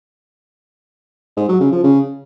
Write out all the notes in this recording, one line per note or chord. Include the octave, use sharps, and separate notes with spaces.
G#2
F#3
C#3
F3
C#3